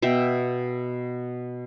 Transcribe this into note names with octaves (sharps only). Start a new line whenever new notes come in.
B2 E5 G5